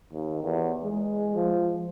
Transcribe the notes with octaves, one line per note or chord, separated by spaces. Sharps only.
D#2
E2
G#3
F3